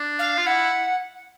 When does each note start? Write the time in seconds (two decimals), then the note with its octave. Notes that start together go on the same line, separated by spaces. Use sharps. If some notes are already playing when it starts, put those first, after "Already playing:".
Already playing: D4
0.19 F5
0.38 F4
0.46 E4 F#5